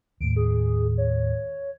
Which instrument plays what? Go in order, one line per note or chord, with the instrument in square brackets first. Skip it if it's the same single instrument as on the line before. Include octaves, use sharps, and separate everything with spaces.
[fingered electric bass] D#2 A2 [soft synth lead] D7
[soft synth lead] G#4
C#5